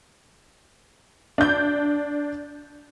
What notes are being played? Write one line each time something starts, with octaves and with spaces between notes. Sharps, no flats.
D4 G6